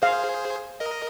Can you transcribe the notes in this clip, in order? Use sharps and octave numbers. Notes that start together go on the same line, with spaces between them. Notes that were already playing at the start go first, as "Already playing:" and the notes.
G#4 C5 F5
A#4 D#5